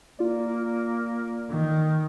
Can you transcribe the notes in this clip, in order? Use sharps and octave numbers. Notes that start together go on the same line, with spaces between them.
A#3 F4 D5
D#3